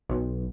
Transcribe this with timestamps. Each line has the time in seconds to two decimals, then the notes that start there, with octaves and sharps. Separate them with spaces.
0.09 B1